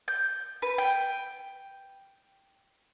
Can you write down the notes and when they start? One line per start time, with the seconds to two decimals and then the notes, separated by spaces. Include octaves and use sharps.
0.08 G6
0.62 B4
0.78 G5